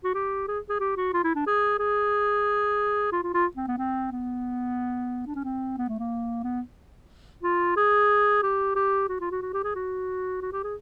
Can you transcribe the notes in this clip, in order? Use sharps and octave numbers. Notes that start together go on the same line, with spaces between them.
F#4
G4
G#4
G#4
G4
F#4
F4
E4
D4
G#4
G#4
F4
F4
F4
C4
B3
C4
B3
D4
C#4
C4
B3
A3
A#3
B3
F4
G#4
G4
G4
F#4
F4
F#4
F#4
G4
G#4
F#4
F#4
G4
G#4